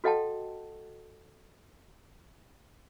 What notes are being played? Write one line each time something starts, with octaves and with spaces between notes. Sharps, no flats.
F#4 A4 D#5 F#5 G5 A5